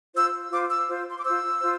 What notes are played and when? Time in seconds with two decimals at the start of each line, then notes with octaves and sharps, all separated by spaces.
0.15 F4 C5 E6
0.51 F4 C5 D6
0.70 E6
0.89 F4 C5
1.10 C6
1.18 D6
1.25 F4 C5 E6
1.62 F4 C5